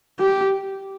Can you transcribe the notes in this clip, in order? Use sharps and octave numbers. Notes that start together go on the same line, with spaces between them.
G4